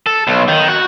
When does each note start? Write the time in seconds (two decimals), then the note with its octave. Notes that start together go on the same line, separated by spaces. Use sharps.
0.06 A4
0.27 B1
0.48 D#3
0.68 F#4